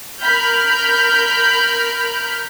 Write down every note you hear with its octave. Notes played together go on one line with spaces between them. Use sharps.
A#4 B5 F6 G6